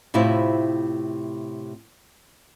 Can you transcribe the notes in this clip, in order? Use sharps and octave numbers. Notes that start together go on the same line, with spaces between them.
A2 C3 C4 E4 F4